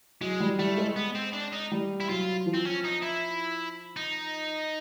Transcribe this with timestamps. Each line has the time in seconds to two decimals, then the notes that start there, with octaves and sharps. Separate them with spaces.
0.21 F#3 G#3
0.40 G3
0.59 G3 A3
0.77 G#3
0.96 B3
1.15 C4
1.33 D4
1.53 D#4
1.72 G3
2.01 E4
2.09 F#3 F4
2.46 F3
2.54 C4
2.65 C#4
2.84 D#4
3.02 E4
3.97 D#4